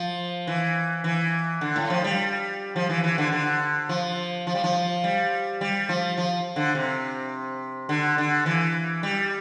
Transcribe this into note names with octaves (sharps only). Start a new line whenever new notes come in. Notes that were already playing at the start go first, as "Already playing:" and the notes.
Already playing: F3
E3
E3
D3
A2
F3
G3
F3
E3
E3
D3
D3
F3
F3
G3
F3
G3
G3
F3
F3
D3
C3
D3
D3
E3
G3